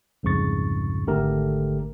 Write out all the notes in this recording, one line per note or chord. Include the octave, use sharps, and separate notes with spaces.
C2 F2 G#2 C#3 C#6 A6
G#1 D3 A3 G4 A#4